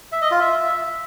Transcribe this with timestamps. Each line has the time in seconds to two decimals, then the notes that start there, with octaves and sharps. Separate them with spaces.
0.12 E5
0.22 D#5
0.31 F4
0.41 E5